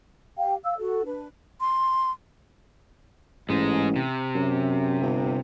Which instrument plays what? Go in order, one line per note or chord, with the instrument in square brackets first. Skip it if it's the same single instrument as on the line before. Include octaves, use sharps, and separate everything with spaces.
[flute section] G4 F5 G5
F5 E6
F#4 A4
D4 B4
[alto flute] C6
[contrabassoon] A1 [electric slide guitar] G#2 G#3
[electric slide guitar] C3
[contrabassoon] F#2
G1